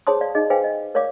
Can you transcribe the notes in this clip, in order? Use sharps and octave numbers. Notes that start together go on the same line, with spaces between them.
G#4 C5 C#5 A5 C6 D#6
D5 F5
D#4 G#4 D#5
G#4 B4 C5 F5 G5 G#5
D#5
A#4 C#5 D5 F5 D6